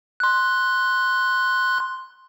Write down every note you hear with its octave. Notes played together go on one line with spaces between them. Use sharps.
C6 F#6